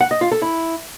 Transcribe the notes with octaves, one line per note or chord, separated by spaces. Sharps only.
F#5
D#5
F4
A4
E4